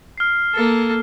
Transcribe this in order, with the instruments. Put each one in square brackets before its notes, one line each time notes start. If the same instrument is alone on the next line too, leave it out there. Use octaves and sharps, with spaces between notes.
[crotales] F6 C7
[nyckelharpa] A#3 A4